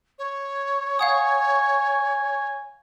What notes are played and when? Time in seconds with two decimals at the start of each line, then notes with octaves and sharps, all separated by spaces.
0.19 C#5
0.99 F5 F#5 G#5 D#6